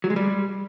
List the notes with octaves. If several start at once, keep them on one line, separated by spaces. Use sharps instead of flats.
F#3
G#3
G3